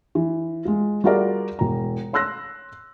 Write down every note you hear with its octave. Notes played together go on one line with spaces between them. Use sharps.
E3
G#3 F4
G3 F4 F#4 G#4 A#4 D5
E1 A#5
C#5 C6 E6 F#6 A#6